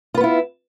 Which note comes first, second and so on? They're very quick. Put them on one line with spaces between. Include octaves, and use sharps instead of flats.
F4 B4 B3 E4